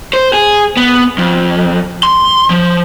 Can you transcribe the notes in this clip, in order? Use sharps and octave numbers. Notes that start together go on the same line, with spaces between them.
C5
G#4
B3
F2
C6
F3